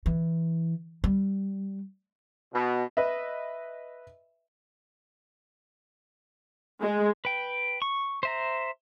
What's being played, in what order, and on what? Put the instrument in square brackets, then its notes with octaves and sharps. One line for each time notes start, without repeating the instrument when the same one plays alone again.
[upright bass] E3
G3
[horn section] B2
[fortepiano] B4 D#5 E5
[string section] G#3
[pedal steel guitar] B4 G5
C#6
C5 E5 A#5